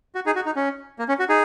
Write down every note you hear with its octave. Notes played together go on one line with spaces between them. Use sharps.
F#4
D#4 G#4
F#4
D#4
C#4
A#3
C#4
F#4
D#4 G#4